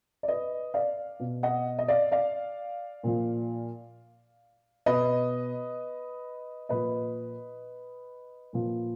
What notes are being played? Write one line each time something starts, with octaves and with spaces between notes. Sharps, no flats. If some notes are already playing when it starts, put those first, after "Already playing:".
D5
B4 D#5
D5 F5
B2
D#5 F#5
D#5
D5 F5
D5 F5
A#2 F3
B2 B4 D#5
A#2 F3 B4 D#5
A#2 F3